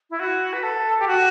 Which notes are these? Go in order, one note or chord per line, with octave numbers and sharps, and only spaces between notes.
E4
F#4
B4
A4
G4
F#4